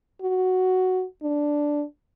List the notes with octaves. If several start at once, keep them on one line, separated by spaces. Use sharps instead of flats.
F#4
D4